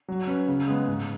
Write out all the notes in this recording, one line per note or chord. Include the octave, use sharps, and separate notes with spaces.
F#3
C#4 B4
C#3
G#3 B3
G#2